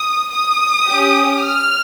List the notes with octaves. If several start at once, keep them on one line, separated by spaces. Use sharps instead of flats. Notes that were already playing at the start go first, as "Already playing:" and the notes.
Already playing: D#6
D#6
C#4 G4
F6